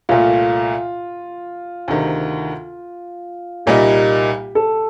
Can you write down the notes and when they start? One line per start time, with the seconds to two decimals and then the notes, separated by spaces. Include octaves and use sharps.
0.09 C2 A#2 A3 F4
1.88 D2 C3 D#3
3.66 C2 A#2 G3 A#3 D#4 G4
4.55 A4